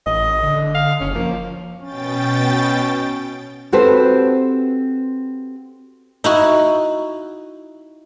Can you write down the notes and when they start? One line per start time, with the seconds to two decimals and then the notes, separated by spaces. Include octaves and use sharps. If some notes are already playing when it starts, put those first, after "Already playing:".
0.06 A1 D#5
0.43 D3
0.74 F5
1.01 F#1 C#4
1.15 F3 A#3
1.83 B2 C#4 G5 A6
3.72 C4 F#4 G4 A4 B4 C5
6.24 D#4 E4 F#4